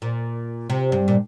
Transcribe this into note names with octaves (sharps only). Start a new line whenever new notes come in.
A#2
C3
G2
A#2